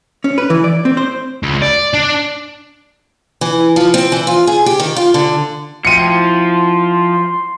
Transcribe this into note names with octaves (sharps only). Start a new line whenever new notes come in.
C#4
B4
E3
D5
C4
C5
C#2
D5
D4
E3
F3
C4
E3
F4
G#4
G4
D#3
F4
D3
F3 C4 E4 F#4 C6 C#7 D#7